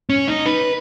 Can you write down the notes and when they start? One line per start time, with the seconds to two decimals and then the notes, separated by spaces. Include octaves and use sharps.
0.10 C#4
0.28 D#4
0.46 B4